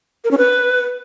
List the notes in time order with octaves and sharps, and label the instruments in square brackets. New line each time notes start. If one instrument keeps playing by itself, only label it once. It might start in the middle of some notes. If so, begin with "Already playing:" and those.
[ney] A#4
C#4
B4